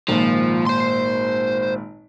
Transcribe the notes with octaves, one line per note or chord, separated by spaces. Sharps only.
G#1 A#2 F3
C5 C6